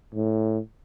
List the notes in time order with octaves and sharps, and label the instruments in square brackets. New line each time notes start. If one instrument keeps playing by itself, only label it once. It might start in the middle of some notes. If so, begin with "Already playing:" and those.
[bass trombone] A2